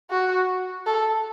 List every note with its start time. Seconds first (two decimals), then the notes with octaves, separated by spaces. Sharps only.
0.10 F#4
0.86 A4